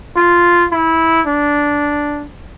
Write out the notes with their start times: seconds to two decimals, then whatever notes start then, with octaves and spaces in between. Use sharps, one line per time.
0.16 F4
0.71 E4
1.26 D4